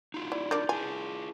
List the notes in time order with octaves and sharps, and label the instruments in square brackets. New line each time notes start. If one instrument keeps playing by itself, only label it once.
[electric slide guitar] D#4 F4 F#4
[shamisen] E4 [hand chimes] D5
[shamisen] D4 A#4 D5 [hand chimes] G6 A6
[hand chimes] E4 A5 [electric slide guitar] F4 G#4 [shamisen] G#5